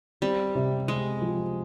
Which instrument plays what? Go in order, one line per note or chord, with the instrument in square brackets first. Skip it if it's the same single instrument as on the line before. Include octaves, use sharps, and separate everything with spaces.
[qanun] G3 [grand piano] C4
[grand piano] C3
[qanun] G#3 [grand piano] C4
[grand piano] F3